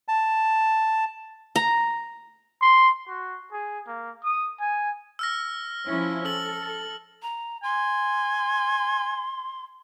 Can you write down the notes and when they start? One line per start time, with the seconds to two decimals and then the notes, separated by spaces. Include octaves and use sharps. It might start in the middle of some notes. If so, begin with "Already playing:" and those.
0.08 A5
1.56 A#5
2.62 C6
3.09 F#4
3.52 G#4
3.87 A#3
4.24 D#6
4.60 G#5
5.19 E6 F6 A#6
5.86 F3 C#4 E4
6.25 A4 E6 F#7
7.22 A#5
7.63 G#5 C6